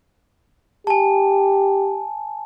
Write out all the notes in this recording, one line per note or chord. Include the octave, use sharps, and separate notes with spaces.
G4 G#5 A5